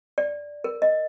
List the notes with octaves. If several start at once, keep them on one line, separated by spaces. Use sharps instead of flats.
D5
A#4
D#5